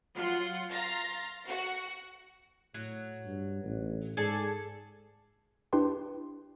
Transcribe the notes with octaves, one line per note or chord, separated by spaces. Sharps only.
F#3 F4 F#5 C6
F5 A#5 C6 A6 A#6
F#4 F#5
A2 F#3
G2
A1
G#2 G#4 A4 D5
D4 E4 G4 B4 G5 C6